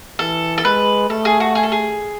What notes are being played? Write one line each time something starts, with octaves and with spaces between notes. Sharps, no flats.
E3 A4
A4
G#3 B4
A3 A4
G#4
F#4
G#4
A4
G#4